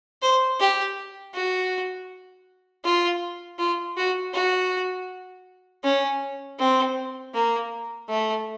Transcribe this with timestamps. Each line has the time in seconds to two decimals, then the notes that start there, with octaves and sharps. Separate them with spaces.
0.22 C5
0.60 G4
1.34 F#4
2.84 F4
3.59 F4
3.97 F#4
4.34 F#4
5.84 C#4
6.59 C4
7.34 A#3
8.09 A3